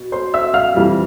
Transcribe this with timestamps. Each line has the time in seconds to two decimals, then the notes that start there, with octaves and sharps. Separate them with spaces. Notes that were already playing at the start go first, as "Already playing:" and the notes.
Already playing: B2
0.12 C5 C6
0.34 E5 E6
0.54 F5 F6
0.74 F2 E3 G3